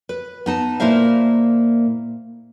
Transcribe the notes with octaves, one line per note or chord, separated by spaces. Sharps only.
B4
B3 D#4 A5
A#2 A#3 E4 C5 E5 F5